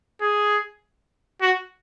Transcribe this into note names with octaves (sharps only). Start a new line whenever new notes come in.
G#4
F#4